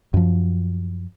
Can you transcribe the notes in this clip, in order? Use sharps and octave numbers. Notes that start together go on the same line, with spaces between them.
F#2 F3